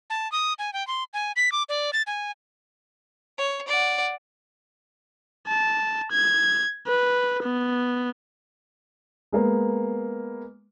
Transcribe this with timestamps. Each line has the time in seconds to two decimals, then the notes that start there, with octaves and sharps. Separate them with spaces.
0.10 A5
0.32 D#6
0.59 G#5
0.73 G5
0.87 C6
1.14 G#5
1.36 B6
1.52 D6
1.69 D5
1.93 A6
2.07 G#5
3.38 C#5
3.68 D5 F#5
5.48 A5
6.11 G#6
6.87 B4
7.43 B3
9.32 G#3 A#3 B3